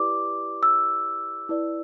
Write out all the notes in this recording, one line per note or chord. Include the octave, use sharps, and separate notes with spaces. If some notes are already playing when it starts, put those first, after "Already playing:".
Already playing: E4 G4 B4 D5 D6
E6
E4 B4 D5